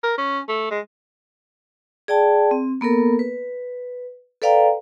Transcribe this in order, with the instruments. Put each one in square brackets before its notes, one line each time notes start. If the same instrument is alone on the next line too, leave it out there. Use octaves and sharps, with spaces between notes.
[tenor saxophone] A#4
C#4
A3
G#3
[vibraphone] G#4 D5 G5 A5
C4
A#3 B3 A4 A#4
B4
A4 B4 D5 F5 G5 A#5